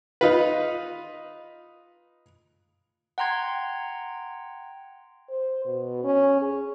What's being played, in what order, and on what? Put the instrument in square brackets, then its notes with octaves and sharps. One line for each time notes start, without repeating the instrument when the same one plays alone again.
[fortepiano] D#4 F4 B4
[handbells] F#5 G5 A#5 C6 G#6
[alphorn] C5
B2
C#4
G#4